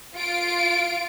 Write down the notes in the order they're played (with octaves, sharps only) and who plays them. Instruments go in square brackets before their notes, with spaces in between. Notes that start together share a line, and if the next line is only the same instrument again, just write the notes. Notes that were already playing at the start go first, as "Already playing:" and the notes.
[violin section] F4 F5 D7